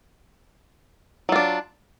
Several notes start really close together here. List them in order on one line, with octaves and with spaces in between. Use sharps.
F#3 F4 D4